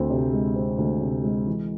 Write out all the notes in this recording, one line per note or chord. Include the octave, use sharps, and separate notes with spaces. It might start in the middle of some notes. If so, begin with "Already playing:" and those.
Already playing: D2 C4
C3
G#3
C4
D2
C3
G#3
E3